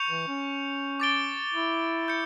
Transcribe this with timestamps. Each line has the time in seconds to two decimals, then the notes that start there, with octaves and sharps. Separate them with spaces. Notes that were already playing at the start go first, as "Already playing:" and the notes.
Already playing: C#6 G6 C#7 F7
0.09 E3
0.27 C#4
1.00 D6 A6 D7 G7
1.54 E4
2.08 G6 C#7